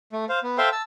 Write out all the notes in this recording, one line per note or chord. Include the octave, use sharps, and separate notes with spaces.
A3
C5 F5
B3
A4 C5 E5 F5 G5 C6
A5 E6